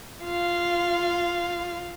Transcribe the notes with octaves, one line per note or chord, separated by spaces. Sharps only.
F4 F5